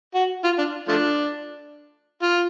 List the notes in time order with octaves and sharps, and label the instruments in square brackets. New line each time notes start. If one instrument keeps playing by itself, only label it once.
[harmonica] F#4
F4
D4
F3 A3 D4
F4